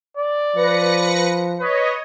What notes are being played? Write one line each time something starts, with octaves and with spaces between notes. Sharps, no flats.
D5
F3 B4 A#6 C#7
B4 C#5 D#5